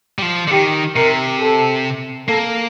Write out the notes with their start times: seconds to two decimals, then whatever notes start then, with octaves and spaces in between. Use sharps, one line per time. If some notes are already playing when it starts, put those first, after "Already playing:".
0.19 G3
0.22 F3
0.47 D3
0.51 D#3 G4
0.96 C3 A#4
1.40 A4
2.29 A#3 A4